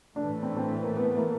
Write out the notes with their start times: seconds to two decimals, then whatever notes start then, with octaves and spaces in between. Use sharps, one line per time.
0.16 A2 E3 A3 D4
0.43 C4
0.57 C4
0.84 A#3
0.97 B3
1.17 A#3